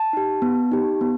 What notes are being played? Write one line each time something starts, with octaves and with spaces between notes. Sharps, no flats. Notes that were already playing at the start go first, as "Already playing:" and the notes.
Already playing: A5
D#4 G4
B3
D#4 G4
B3